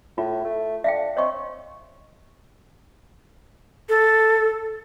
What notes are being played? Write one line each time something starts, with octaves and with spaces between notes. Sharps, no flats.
A2 F4
A3
D4 E5 F5 G5
C4 C#5 D#5 C#6
A4